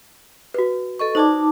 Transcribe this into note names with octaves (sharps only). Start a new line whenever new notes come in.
F#4 B4
A4 D#5 C#6
D#4 C5 D5 A5 D6